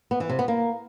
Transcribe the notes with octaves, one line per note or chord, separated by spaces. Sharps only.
B3
E3
C3
B3
A#3